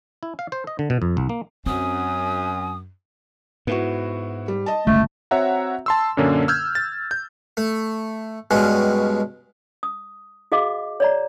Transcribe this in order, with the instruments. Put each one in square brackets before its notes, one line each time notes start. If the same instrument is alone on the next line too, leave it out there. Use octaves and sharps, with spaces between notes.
[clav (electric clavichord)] E4
F5
C5
D#5
D3
B2
F2
C2
A#3
[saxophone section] F#2 [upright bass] C4 [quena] G#5 [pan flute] D#6
[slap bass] G#2 [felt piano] B3 E4 F#4
[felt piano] G3
D#5 A5
[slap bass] G1 C#2 [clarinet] A3
[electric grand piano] C4 F#4 C#5 E5 F#5 A#5
A5 C6 E6
F#2 A#2 D3 A#3 C#4 D4
E6 F6 G6 G#6
A6
G6
[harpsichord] A3
G2 B2 G#3 C#4
[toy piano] D#6
F#4 G#4 D#5 F5 D6
C#5 D5 A#5